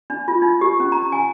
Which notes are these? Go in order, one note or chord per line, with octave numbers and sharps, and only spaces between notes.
D4
F4
D#4
G4
C#4
A#5
G#5